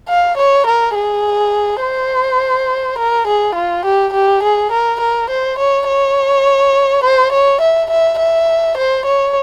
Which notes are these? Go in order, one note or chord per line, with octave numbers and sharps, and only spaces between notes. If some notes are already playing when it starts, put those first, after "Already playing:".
F5
C#5
A#4
G#4
C5
A#4
G#4
F4
G4
G4
G#4
A#4
A#4
C5
C#5
C#5
C5
C#5
E5
E5
E5
C5
C#5